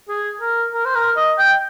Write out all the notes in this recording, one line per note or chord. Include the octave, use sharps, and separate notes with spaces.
G#4
A#4
A#4
C5
A#4
D#5
G5